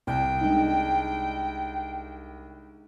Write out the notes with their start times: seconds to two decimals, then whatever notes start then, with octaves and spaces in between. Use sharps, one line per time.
0.07 C2 G5
0.41 G#3 D4 D#4